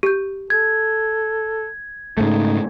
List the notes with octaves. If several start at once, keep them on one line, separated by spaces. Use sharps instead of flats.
G4 G6
A4 G#6
G#2 C#3 A3 D#4